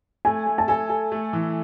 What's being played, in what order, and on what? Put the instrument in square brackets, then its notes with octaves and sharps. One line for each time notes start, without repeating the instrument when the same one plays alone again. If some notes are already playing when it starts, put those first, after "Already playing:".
[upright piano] A3 [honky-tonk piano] G#5
[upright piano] A3
[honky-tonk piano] A5
[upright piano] A4 [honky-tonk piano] G#5
[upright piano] A4
A3
E3